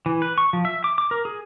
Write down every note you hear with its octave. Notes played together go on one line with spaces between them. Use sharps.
E3
B4
C#6
F3
E5
D6
D6
A#4
G#4